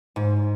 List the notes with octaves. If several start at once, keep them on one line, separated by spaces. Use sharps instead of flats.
G#2